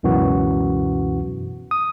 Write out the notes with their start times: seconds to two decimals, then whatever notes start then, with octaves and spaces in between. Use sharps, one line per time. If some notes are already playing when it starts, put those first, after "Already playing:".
0.03 C#2 F#2 B2 E3 F#4
1.71 D#6